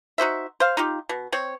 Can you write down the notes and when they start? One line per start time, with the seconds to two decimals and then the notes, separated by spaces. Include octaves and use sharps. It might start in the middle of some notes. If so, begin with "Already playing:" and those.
0.18 D#4 F#4 C5 E5
0.60 C5 F5
0.77 D#4 F4 G4
1.09 B2
1.32 C4 C#5